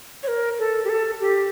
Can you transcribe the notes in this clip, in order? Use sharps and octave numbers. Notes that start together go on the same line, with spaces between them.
C#5
A#4
A4
G4
A4
G4